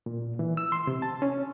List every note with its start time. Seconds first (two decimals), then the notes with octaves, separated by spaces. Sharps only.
0.06 A#2
0.39 E3
0.57 E6
0.72 C6
0.87 C3
1.02 A5
1.22 C#4